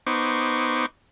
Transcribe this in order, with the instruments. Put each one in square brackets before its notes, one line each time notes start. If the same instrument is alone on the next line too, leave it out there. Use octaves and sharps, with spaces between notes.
[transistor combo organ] B3 D#4 C5 C#6 D6